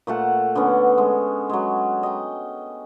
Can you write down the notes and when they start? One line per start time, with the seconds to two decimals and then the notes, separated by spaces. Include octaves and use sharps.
0.07 A#2 A3 F#5 A5
0.55 D3 A3 B3 C#4
0.98 G#3
1.49 F#3 G#3
2.03 D#5 G5